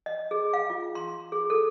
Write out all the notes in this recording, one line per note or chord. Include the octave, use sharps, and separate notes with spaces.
D#5
G#4
F5
F4
C6
G#4
A4